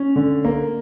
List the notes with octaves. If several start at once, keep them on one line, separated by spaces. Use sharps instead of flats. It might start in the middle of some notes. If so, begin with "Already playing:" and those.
Already playing: C#4
D3
A#3